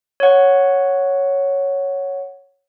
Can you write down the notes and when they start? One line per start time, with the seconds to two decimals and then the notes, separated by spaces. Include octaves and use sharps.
0.20 C#5 F#5